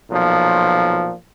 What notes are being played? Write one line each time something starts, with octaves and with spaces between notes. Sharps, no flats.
B1 A#2 F3